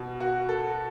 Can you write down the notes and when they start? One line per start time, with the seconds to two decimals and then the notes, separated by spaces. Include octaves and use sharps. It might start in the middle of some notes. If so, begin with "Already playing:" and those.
Already playing: B2
0.20 F#4
0.49 A4